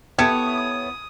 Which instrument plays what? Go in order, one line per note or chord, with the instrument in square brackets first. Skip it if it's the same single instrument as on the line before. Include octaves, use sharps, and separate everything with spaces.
[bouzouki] B3 E4 C#5 [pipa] G4 A4 [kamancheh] D#6 [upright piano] G#6